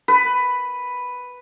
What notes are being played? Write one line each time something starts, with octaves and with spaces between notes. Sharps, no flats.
B4